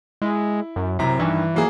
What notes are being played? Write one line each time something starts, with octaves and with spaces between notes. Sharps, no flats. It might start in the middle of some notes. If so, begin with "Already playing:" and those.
G#3 E4
F#2
F#2 C3 E4 A#5
G2 D#3 E3
F#3 A#3 G#4